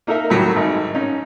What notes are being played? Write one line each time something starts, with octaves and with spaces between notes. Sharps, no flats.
A#3 D#4 A4 A#4 E5
A2 D#3 F#3 G3
G#1
C#4 D#4